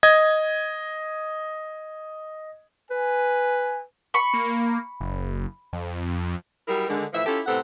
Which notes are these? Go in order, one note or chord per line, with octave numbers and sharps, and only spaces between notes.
D#5 G#6
B4 G#5
B5 C#6
A#3
F#1
F2
F#3 G3 E4 G#4 A#4
D3 D#3 G#3
A2 E3 F3 E5
C#4 E4 F4 G4 A4
A2 C3 B3 C4 A4 F#5